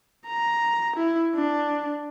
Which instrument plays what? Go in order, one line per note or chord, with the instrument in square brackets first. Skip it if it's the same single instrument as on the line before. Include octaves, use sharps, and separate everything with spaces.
[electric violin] A#5
E4
D4